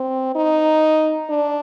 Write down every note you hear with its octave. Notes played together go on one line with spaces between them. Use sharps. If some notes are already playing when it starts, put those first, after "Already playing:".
Already playing: C4
D#4
D4